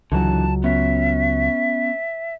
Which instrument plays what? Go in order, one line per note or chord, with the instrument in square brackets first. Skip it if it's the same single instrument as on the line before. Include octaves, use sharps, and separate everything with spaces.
[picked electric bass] C#2 F#3 [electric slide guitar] D3 E3 F#4 [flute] A5
[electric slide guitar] B3 C#4 [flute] E5